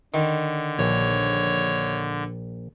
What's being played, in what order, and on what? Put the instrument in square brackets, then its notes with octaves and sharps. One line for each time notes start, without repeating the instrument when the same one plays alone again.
[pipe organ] D3 [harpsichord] D#3
[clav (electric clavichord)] A#1 [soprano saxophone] C#5